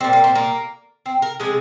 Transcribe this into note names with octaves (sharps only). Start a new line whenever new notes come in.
A#2 G3 C4
A#3
C4
A#3
C4
A#4
C3 F3 G#3 G#4